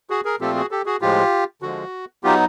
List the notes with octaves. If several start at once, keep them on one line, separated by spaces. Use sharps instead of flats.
F#4 G#4
G#4 A#4
A#2 F3 A3 C4 F4 G4 A4
F#4 G#4
G4 A4
F#4 G#4
A2 F3 G#3 F4 G4
D3 F3 G#3 F#4
F#3 B3 D#4 F4 G4